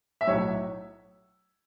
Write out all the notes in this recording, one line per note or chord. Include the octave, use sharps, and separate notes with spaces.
E5
B1 A2 F#3 C#5